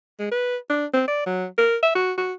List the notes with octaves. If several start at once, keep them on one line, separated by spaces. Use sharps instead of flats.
G#3
B4
D4
C4
D5
F#3
A#4
E5
F#4
F#4